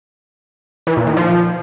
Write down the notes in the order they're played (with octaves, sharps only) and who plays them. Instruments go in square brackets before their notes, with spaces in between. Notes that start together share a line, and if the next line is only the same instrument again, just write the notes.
[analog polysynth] E3
A#2
D#3
F3